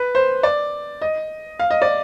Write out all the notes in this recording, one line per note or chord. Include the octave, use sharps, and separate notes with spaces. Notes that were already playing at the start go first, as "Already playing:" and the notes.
Already playing: B4
C5
D5
D#5
F5
D#5
D5